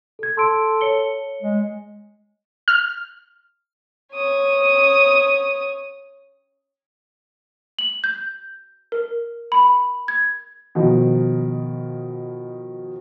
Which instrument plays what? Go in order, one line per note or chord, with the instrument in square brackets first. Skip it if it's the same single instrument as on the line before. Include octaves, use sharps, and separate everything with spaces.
[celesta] A4 G#6
[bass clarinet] A4 [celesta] C6 E6 D7
[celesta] C#5 C#7 G7
[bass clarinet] G#3
[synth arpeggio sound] F6
[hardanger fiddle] C#5 D#6
[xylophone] F#7
G6
A#4
B5
G#6
[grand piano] B2 D#3 F3